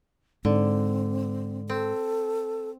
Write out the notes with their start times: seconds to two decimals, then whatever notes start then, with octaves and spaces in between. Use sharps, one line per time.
0.45 G#2 D3 C4
1.69 C4 A4